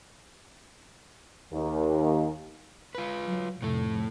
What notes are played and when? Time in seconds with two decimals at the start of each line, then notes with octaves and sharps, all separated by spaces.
1.52 D#2
2.95 F4 B4
3.25 F#3
3.62 F1 A2 A3